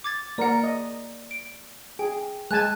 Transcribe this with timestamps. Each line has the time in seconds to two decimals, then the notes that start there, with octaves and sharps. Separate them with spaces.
0.04 D6 G#6 A6
0.38 A#3 A#4 D5 F#5
0.64 D#5
1.31 D7
1.99 G#4 G5
2.51 G#3 G#5 A5 F#6 G#6